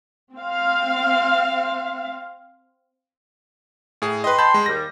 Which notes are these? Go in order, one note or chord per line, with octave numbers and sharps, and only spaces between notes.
C4 F5
A2 G#4
B4 D#5 G5 C6
A5 B5 G6
G#3
D#2 G3 A#6